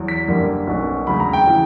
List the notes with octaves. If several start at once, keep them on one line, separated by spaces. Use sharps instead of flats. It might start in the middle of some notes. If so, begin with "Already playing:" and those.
Already playing: E2 F#3
B6
G1 F#2 D3 G3 A#3
B1 B2 A#3 C#4
E1 D2 C#3 F#3 B5
A#5
G5
C#3 E3